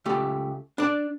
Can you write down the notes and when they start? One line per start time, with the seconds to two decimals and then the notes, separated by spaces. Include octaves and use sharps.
0.05 C#2 A3 G4
0.78 D4 D5